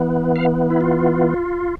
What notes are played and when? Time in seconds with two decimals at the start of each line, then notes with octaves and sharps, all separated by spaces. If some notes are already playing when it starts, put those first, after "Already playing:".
Already playing: E3 B3
0.36 F5
0.70 E4
0.81 F4